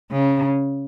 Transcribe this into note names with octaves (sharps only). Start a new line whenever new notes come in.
C#3